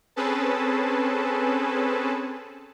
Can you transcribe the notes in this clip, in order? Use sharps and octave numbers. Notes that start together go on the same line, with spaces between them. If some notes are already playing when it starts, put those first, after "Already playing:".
C4 C#4 G#4 A4 B4 A5